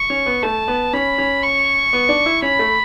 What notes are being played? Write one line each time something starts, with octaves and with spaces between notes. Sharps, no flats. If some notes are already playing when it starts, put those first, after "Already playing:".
Already playing: C#6
C#4
B3
A3 A5
B3
C#4 B5
C#4
C#6
B3
D4
E4
C#4 B5
A3